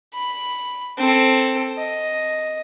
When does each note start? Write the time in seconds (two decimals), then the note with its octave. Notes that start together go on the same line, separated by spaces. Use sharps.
0.14 B5
0.98 C4 A4
1.78 D#5